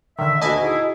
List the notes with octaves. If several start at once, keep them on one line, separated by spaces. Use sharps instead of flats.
D3 D#3 E5
D2 A#3 F#4 D#5 G#5 A5 B5
D#4 E4 G#4